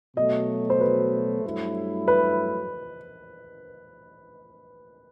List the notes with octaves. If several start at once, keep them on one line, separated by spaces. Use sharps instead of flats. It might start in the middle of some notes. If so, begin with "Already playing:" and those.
B2 F#3 A3 D#5
C5
B4
G2 F#3 A3 E4
B4